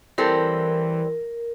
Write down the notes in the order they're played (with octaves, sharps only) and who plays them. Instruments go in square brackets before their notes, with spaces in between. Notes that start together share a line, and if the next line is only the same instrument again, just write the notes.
[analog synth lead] E3 [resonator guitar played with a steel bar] G3 C4 A4 [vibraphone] A#4